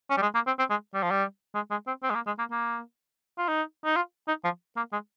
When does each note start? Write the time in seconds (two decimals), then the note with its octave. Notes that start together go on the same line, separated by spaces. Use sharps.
0.11 C#4
0.17 G3
0.22 G#3
0.34 A#3
0.47 C4
0.59 C4
0.70 G#3
0.94 G3
1.03 F3
1.10 G3
1.55 G#3
1.71 G#3
1.87 C4
2.03 C4
2.10 G#3
2.15 A#3
2.27 G#3
2.39 A#3
2.51 A#3
3.38 F4
3.48 D#4
3.85 D#4
3.96 F4
4.28 D#4
4.44 F3
4.77 A#3
4.92 G#3